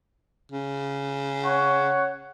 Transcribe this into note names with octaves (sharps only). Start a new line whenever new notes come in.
C#3
C#5 F#5